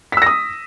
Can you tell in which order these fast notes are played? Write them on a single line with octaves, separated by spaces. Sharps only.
B6 E6 A#6 D#6